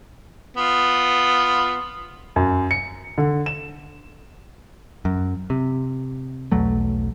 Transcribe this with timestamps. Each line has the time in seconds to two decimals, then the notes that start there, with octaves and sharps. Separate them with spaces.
0.57 B3 F4
2.36 F#2
2.71 C#7
3.18 D3
3.46 E7
5.05 F#2
5.50 C3
6.52 B1 E2 F#3 A3